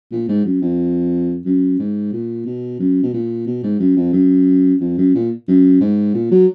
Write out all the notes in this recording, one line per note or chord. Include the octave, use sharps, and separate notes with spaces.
A#2
G#2
F#2
F2
F#2
G#2
A#2
B2
F#2
B2
A#2
B2
G#2
F#2
F2
F#2
F2
F#2
A#2
F#2
G#2
A#2
F#3